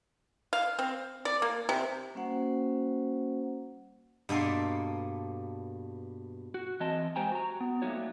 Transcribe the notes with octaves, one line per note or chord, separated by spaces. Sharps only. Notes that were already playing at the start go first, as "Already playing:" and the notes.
F5
C4
D5
A#3
C3
G3 A#3 C#4 F#4 C5 F#5
G2 B2 A#3 A4 C6
F#4
E3 C4 D#5 A5
G#3 G4 C5 G5 G#5 A#5
F#4 A#5
B3
G3 A3 A#3 D#4 F#4 C#5